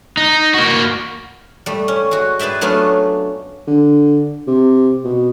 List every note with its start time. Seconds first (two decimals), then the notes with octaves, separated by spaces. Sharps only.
0.17 D#4
0.54 A#3 F#4
1.66 G3 A3
1.88 C#4
2.11 G#3 F#4
2.39 G#4 B4 D5 E5 G5
2.61 F#3 A3 B3 C#4 D4 F4
3.67 D3
4.47 C3
5.04 B2